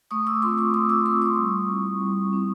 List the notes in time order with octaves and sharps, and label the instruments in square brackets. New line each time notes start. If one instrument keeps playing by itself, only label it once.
[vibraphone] A3 C#6 D#6
D6 E6
F4 C6 D6
C4
C#6 D#6
A3 C#6 D#6
D6 E6
C4 F4 C6 D6
C#6 D#6
G3
C4 E4
G3
C4 E4